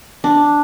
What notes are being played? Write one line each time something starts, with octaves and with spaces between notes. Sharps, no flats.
D4